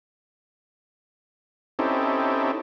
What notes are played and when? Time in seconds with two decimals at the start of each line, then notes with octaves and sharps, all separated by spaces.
1.79 C4 C#4 D#4 E4 G4 A4